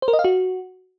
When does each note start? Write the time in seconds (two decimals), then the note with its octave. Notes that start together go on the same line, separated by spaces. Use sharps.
0.02 C5
0.08 A#4
0.13 D#5
0.19 F5
0.24 F#4